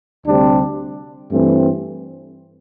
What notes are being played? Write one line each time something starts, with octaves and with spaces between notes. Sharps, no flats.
D2 C3 G3 C4 D4
G2 E3 A3 C4